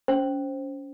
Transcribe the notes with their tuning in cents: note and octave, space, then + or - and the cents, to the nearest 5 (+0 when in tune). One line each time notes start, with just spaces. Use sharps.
C#4 +25 C5 +10